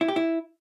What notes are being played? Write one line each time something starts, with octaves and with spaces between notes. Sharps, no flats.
E4
G4
E4